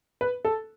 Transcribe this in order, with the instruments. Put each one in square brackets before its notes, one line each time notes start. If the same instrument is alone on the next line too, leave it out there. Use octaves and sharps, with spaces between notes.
[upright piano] B4
A4